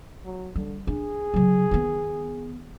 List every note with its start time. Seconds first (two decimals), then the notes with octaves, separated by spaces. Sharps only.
0.25 F#3
0.56 D3 G3
0.87 D4 G#4
1.34 C#3 F#3
1.71 D#3 B3